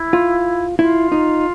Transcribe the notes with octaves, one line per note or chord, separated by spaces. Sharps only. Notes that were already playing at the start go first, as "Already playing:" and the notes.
Already playing: E4
F4
E4 F4
D#4